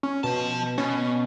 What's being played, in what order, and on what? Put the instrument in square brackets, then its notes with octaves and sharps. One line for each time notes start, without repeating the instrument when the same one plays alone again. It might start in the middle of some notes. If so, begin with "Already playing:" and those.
[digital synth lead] C#4
[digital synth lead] B2 [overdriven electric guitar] F3 A5
[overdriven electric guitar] B2 [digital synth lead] C#4